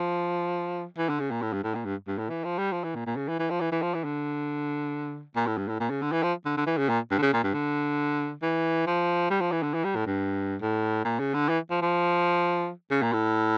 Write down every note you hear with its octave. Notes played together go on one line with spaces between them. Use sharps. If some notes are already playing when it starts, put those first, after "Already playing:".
Already playing: F3
E3
D3
C#3
A#2
A2
G2
A2
A#2
G2
G2
A2
E3
F3
G3
F3
E3
A#2
A#2
C#3
E3
E3
F3
E3
E3
F3
E3
D3
A#2
A2
G2
A2
A#2
C#3
D3
E3
F3
D3
D3
E3
C#3
A#2
G2
D3
C#3
A#2
G2
D3
E3
F3
G3
F3
E3
D3
E3
G3
A2
G2
A2
A#2
C#3
D3
E3
F3
F3
C#3
A#2
A2